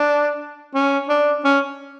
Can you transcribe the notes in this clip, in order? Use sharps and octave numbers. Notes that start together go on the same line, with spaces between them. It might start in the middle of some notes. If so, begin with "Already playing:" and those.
Already playing: D4
C#4
D4
C#4